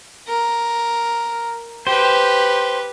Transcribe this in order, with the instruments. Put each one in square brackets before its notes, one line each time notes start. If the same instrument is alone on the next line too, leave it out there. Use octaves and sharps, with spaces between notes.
[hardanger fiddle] A#4
[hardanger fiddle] G4 B4 [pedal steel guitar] C5